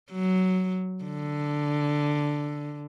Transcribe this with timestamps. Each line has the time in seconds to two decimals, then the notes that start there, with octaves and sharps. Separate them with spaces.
0.12 F#3
1.04 D3